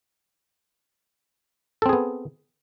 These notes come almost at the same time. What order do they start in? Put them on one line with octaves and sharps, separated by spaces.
A4 C4 G#4 B3